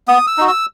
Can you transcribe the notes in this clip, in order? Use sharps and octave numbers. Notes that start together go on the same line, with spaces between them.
B3 D#6
E6
D#4 F#4
E6